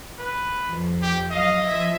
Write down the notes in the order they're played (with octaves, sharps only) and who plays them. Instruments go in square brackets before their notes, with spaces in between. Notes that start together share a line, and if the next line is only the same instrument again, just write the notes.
[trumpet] B4
[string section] F2
[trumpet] G4
[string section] F#3 F5 [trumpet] D#5
[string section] F3 E5 G#6